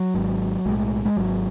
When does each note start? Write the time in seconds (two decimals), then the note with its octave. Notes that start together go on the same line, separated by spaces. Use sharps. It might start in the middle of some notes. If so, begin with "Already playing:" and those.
Already playing: F#3
0.14 G#1 G#2
0.65 B1 A2 G#3
1.05 G#3
1.17 G#1 G#2 F#3